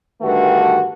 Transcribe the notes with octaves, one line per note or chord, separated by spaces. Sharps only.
G2 D3 D#3 A3 F#4 B4